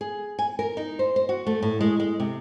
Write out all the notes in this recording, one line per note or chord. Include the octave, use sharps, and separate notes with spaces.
G#4
G#5
A#4
D#4
C5
C5
F#4
A3
A2
G#3
G#3
C3